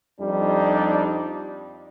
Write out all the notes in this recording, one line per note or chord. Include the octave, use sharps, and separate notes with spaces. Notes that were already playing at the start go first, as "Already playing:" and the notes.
F2 G3 D4 D#4